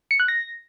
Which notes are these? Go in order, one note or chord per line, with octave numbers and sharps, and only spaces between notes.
C#7
F#6
A#6